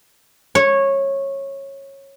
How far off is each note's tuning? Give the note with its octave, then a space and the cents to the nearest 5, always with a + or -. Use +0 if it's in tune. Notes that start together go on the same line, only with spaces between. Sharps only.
C#5 -15